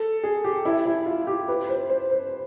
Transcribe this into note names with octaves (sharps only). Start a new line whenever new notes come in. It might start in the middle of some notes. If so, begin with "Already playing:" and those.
Already playing: A4
G#4
G4
E4
E4
F4
G4
B4
C5
C5
C5